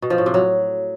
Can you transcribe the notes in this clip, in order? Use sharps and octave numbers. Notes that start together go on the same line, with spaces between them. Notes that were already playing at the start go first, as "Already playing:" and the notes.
B2
F3
A2
C3
F#3